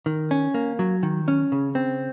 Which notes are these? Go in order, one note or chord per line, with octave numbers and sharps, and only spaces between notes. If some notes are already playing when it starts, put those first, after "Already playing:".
D#3
C#4
A#3
F#3
D#3
C#4
C#3
C4